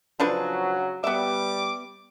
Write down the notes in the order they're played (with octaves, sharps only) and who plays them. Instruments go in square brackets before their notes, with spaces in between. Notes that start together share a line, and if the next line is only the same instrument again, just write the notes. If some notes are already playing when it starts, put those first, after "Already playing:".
[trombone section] C#3 F#3 [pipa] F3 D4 B4
[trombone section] G3 [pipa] B3 E5 [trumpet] D6